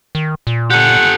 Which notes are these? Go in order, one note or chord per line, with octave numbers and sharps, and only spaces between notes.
D#3
A#2
G4 A4 F#5